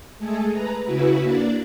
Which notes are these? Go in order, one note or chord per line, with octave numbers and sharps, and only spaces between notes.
G#3 A3 G#4 A4
B4 A#5
C#3 E4 F#4 B4
A#3 D4 D5